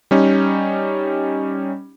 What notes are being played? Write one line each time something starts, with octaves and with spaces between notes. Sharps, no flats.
G3 C#4 D#4